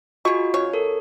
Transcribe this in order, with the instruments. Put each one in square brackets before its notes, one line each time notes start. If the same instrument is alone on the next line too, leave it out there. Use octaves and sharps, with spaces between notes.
[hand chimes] F4 F#4 D#5 [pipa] G#4 C#6
[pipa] C#3 C#5
[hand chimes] A4 A#4